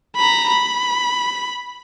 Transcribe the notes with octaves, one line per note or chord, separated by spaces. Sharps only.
A#5 B5
B5